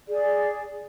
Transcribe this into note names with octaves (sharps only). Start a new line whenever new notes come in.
G#4 D5